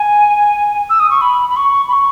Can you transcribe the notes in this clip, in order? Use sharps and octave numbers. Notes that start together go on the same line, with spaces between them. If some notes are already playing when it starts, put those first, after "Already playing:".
Already playing: G#5
E6
D#6
C#6
B5
B5
C#6
B5
C#6